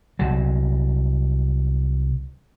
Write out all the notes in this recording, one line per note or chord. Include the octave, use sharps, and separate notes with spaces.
C2 F#3